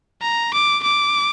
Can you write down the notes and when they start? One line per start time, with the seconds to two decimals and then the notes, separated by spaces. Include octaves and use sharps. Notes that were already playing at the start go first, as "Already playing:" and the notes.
0.22 A#5
0.53 D6
0.83 D6